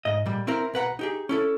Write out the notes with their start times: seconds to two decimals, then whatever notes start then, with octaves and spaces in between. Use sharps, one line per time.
0.05 G#2 D#5
0.26 A#2 G3
0.47 C4 E4 A#4
0.74 B1 B4 F#5 A#5
0.99 D#4 G4 G#4
1.29 C#4 E4 A4